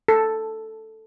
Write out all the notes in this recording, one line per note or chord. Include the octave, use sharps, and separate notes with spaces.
A4